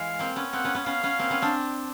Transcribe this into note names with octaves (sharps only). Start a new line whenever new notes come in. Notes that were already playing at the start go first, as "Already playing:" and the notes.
Already playing: E3 G#3 F5
A#3 C4
B3 C#4
A#3 C4 F#5
B3 C#4
B3 C#4
B3 C#4 F5
B3 C#4
A#3 C4
B3 C#4
C4 D4